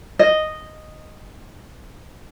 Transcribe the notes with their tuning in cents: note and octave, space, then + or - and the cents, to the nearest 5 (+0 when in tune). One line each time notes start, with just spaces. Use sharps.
D#5 -5